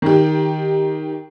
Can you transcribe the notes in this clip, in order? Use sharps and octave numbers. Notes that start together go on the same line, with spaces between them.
D#3 G4